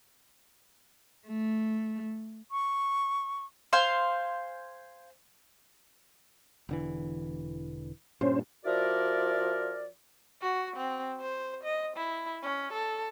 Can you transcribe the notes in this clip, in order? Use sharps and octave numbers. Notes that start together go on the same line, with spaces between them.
A3
C#6
C5 F5 G#5
E1 D3 E3
G2 A#2 C#4 C5
F3 E4 F#4 A#4 D5
F#4
C4
C5
D#5
E4
C#4
A4